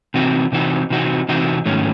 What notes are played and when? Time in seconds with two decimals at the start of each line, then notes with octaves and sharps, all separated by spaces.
0.14 C3 E3 C4 D#4 F#4
0.52 C3 E3 C4 D#4 F#4
0.90 C3 E3 C4 D#4 F#4
1.29 C3 E3 C4 D#4 F#4
1.66 G#2 D#3 F#3 A3 C#4